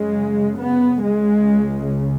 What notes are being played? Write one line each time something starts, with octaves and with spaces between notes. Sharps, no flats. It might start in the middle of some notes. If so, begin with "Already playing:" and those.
Already playing: F#2 C#3 G#3
B3
C#2 C#3 G#3